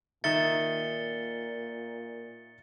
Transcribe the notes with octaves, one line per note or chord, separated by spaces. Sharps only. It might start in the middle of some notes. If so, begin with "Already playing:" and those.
A#2 D#3 E5 A6 C#7 G7